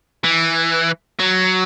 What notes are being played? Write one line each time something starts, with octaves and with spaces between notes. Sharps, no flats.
E3
F#3